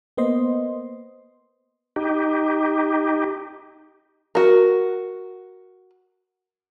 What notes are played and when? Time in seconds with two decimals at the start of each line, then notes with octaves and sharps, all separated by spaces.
0.17 A#3 B3 C5 D#5 C6
1.96 D#4 G4
4.35 F#4 A#4